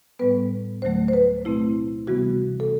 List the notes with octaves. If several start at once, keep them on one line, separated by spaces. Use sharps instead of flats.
A2 G3 B3 B4
D2 D3 F#3 A3 C5
C5
B4
B2 A3 C4 E4
C3 E3 G3 B3 F#4
A4